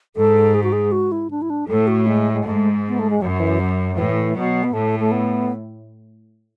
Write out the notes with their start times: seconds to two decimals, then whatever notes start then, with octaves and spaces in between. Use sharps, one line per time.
0.16 G#2 A4
0.54 G#4
0.63 F#4
0.72 G#4
0.92 F#4
1.12 E4
1.31 D4
1.42 E4
1.50 D4
1.69 A2 A4
1.88 F#4
2.07 G#3
2.33 G#3
2.45 G#2 A3
2.88 B3
2.99 A3
3.10 G#3
3.21 F#2 F#3
3.40 E3
3.60 F#3
3.97 A2 E3
4.35 B2 F#3
4.64 B3
4.73 A2 A3
5.00 A3
5.12 B3